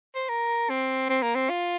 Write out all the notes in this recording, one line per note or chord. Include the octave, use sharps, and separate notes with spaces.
C5
A#4
C4
C4
A#3
C4
F4